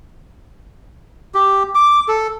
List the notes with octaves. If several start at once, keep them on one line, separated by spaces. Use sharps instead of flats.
G4
D6
A4